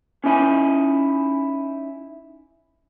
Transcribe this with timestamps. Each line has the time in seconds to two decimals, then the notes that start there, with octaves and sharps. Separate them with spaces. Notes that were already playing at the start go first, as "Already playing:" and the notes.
0.24 C#4 D#4 E4 G#5